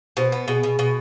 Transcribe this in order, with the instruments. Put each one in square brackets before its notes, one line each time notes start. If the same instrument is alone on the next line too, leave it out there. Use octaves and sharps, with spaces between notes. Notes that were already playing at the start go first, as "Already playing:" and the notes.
[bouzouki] B2 [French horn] C5
[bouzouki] B3
[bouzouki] B2 [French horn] G#4
[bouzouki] B2
B2